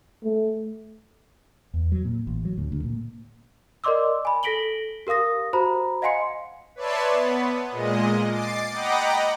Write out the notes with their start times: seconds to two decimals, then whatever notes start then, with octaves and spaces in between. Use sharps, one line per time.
0.25 A3
1.74 E2
1.92 F#3
2.05 A#2
2.27 A1
2.45 F#3
2.58 D2
2.72 D2
2.84 A#2
3.84 A#4 D5 D#5 C6 D6 E6
4.25 G#5 B5
4.43 A4 A#6 B6 D7 F#7 G7
5.07 G4 A#4 F5 D#6 A#6
5.53 F#4 C5 A#5 B5
6.02 D#5 F5 F#5 G#5 C6 C#7
6.75 B4 C#5 D5 E5 A5 C6
7.10 B3
7.71 A#2 G#3 D#5
8.29 D6 A6 C7
8.70 D#5 F#5 G5 A#5 B5 D6